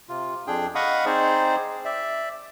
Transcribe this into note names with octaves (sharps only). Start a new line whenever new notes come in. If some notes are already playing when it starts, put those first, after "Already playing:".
C3 F4
F2 D4 G#4 G5
D#5 F5 F#5 B5 C#6 D#6
C4 D#4 G#4 C5 D5
D5 E5